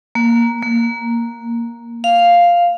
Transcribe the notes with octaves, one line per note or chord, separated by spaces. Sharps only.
A#3
A#3
F5